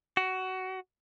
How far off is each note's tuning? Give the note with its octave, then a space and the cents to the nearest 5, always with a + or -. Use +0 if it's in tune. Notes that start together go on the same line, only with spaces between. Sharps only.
F#4 +15